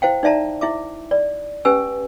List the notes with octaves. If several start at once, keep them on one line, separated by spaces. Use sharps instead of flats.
E4 C5 F5 G5
D#4 D5 E5 A5 A#5
E4 E5 D6
D5
C#4 G4 B4 G#5 E6